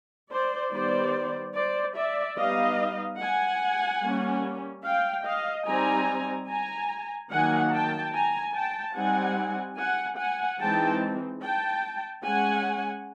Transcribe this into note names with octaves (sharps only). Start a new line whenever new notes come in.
C5 D5
D#3 G3 B3 C5 D5
C5 D5
D5 E5
G3 B3 D#4 D#5 F5
F#5 G#5
G3 A#3 C#4
F5 G5
D#5 F5
G3 C4 D#4 G#5 A#5
G#5 A#5
D#3 F#3 A#3 F#5 G#5
G5 A5
G#5 A#5
G5 A5
G3 C4 D#4 F#5 G#5
F#5 G#5
F#5 G#5
E3 G#3 C4 D#4 G5 A5
G5 A5
G#3 C#4 F#5 G#5